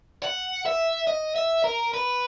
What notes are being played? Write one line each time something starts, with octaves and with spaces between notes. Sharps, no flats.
F#5
E5
D#5
E5
A#4
B4